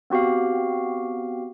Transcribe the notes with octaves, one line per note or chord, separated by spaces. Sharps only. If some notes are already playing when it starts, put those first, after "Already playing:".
B3 C4 F#4 G4 F5